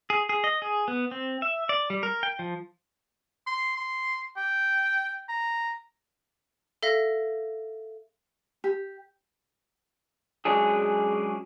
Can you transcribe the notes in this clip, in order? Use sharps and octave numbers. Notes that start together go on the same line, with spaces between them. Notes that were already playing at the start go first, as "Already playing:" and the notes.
G#4
G#4
D#5
G#4
B3
C4
E5
D5
G3
A#4
G5
F3
C6
C6
G5
A#5
A4 E5 F5 A#6
G4
F#3 G#3 C#4 D4 G#4